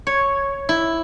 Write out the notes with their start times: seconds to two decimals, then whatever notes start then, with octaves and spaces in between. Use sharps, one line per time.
0.07 C#5
0.69 E4